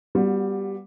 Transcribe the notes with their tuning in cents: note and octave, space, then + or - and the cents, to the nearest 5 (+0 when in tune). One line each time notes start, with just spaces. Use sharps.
G3 +0 B3 -15 F#4 -35